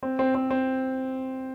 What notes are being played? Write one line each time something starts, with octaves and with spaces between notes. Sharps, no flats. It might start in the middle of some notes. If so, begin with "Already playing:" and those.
C4
C4
C4
C4